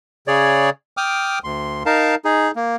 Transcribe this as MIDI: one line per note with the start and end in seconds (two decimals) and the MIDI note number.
0.27 0.70 49
0.27 0.70 68
0.27 0.70 73
0.27 0.70 74
0.97 1.39 79
0.97 1.39 86
0.97 1.39 87
0.97 1.39 89
1.44 1.83 38
1.44 1.83 84
1.86 2.15 63
1.86 2.15 70
1.86 2.15 77
1.86 2.15 81
2.25 2.51 63
2.25 2.51 68
2.56 2.76 58